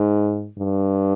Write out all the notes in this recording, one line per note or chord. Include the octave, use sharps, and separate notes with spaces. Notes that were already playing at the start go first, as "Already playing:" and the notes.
Already playing: G#2
G2